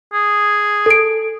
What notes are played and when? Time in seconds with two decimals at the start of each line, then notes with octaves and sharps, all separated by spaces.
0.13 G#4
0.86 A4 D7